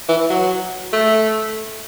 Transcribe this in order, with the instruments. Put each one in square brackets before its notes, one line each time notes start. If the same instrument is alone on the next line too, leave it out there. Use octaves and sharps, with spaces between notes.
[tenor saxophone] E3
F#3
A3